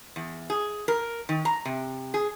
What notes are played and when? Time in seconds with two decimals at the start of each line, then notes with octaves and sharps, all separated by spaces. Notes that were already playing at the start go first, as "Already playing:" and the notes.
0.16 E2
0.50 G#4
0.88 A#4
1.29 D#3
1.45 A#5
1.65 C3
2.14 G#4